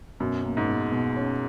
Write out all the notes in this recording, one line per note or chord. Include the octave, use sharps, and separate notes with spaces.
F#2 B2
A#3
G#2
B2
B2
C#4